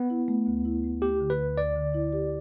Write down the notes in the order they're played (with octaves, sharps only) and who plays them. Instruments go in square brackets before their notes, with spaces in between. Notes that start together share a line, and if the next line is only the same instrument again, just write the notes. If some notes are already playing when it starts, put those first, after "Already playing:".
Already playing: [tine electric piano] B3
[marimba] E4
A3
D2
E4
A3
[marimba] A3 [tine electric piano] G4
[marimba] D3
[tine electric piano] B4
[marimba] D2
[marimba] D2 [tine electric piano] D5
[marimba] D3
E4
G4